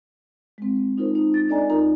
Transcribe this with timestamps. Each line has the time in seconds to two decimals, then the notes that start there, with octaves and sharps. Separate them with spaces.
0.58 G#3 C4
0.98 D#4 F4 A#4 C5
1.15 D#4
1.34 A6
1.49 D4 A4 D5 D#5 G#5 A#5
1.70 D2 D#4 F4 A#4 A#5